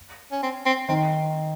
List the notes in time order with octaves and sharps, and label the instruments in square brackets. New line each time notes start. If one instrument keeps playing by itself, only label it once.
[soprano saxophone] C#4
C4
C4
[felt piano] D#3 [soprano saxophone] C4